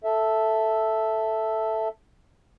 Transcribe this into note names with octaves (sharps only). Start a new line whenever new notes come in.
A4 E5